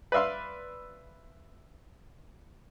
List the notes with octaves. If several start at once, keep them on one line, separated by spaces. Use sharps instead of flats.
B4 D5 E5 F5 C6